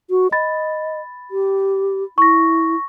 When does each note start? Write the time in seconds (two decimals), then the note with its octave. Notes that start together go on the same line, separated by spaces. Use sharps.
0.10 F#4
0.32 D#5 B5 A6
1.31 G4
2.18 E4 C#6 A#6